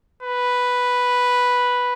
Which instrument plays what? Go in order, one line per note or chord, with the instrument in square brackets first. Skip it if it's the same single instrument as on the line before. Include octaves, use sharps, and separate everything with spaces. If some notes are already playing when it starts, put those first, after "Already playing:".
[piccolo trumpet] B4